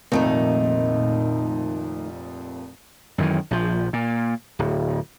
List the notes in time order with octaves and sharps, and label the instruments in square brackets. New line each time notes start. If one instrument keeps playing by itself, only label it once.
[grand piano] F1 F2 A#2 [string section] A#1 [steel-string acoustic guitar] D#3 A3 D#4
[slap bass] F#2 D#3 E3
A#1 F3
A#2
D1